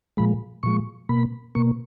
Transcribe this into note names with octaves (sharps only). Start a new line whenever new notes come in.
A#2 F3 G#3 B5
A#2 F3 G#3 C#6
B2 A#3 B5
B2 A#3 C#6